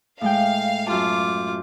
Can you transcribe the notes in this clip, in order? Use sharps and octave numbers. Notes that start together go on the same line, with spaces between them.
A2 G#3 F5 G5
F#2 F4 A5 D6